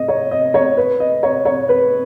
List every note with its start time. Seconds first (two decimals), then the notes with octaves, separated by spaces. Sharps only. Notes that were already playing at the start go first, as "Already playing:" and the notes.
Already playing: D#5
0.08 C#5
0.31 D#5
0.54 C#5
0.77 B4
1.00 D#5
1.23 C#5
1.45 C#5
1.69 B4